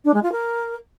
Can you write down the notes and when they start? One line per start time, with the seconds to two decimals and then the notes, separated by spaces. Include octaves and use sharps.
0.05 D4
0.14 G#3
0.23 F4
0.32 A#4